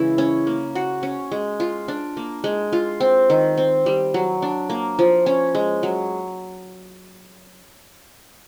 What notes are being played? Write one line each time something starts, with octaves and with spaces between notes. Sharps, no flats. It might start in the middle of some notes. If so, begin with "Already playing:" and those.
Already playing: C#3 E3 G#3 E4
C#4
A#3
F#4
C#4
G#3
F4
D4
A#3
G#3
F4
C4
D#3
C4
G3
F#3
D4
A#3
F3
C#4
G#3
F#3